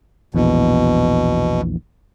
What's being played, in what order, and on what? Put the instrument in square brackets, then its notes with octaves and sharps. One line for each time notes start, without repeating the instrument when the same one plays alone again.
[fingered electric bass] A#1 E2 [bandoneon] B2